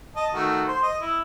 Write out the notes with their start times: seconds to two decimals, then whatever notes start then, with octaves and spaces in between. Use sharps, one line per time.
0.16 D#5 A5
0.34 D#3 A3 F#4
0.68 C5
0.83 D#5
1.02 E4